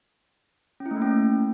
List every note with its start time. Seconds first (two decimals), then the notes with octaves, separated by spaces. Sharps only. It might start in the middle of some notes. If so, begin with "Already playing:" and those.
0.80 C#4
0.86 E4
0.91 A3
0.96 A#3
1.02 C#4